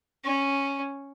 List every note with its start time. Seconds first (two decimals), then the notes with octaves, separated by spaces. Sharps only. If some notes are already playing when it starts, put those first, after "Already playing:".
0.24 C#4